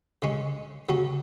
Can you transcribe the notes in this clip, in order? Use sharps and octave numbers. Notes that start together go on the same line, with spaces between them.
C#3 G#3 C#4
C#3 F#3 C#4